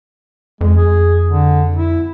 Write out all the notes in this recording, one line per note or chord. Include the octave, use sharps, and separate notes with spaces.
F2 G#3
G#4
D3
E4